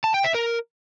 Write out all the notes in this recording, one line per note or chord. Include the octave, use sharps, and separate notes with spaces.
A5
G5
E5
A#4